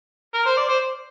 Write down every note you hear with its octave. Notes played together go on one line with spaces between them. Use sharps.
A#4
C5
D5
C5